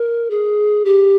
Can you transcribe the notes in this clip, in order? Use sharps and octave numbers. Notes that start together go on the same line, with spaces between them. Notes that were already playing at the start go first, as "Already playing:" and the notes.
Already playing: A#4
G#4
G4